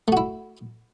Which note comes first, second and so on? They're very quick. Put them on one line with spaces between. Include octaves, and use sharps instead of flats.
A3 F#4 E4